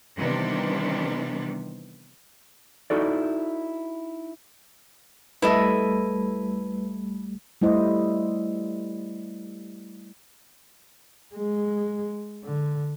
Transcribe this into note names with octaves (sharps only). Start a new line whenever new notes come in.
C3 D#3 E3 G3 B3 D4
D#4 E4 F#4 A4 D5
G#1 G3 A3 E4 A4 B4 D#5
G3 A3 E4 C5 D#5
G#3
D3